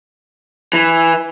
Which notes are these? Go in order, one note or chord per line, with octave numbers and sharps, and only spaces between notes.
E3